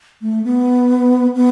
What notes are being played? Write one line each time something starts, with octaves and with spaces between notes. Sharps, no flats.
A3
B3
B3